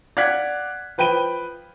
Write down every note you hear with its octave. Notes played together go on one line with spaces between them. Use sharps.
D5 F5 F#5 F#6 G#6 B6
F3 B4 G5 B5 D#7 G7